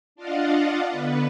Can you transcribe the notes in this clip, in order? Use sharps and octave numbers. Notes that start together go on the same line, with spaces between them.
D4 F4 D5 D#5 F5 F#5
D3 B3 B4